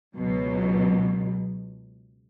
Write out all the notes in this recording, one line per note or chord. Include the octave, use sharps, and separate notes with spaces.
C#2 B2 F#3